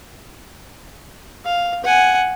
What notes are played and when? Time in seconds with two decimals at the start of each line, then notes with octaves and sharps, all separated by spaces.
1.45 F5
1.84 F#5 G#5